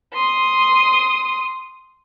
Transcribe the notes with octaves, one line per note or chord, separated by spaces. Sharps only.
C6 D#6